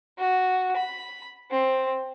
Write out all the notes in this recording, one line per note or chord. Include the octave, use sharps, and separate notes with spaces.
F#4
B5
C4